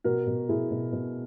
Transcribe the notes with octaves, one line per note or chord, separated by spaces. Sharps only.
B2 F#4 A#4
B2
B2 E4 G#4
B2
B2